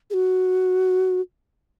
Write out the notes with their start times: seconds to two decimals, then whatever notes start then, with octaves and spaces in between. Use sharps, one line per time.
0.10 G#4
0.14 F#4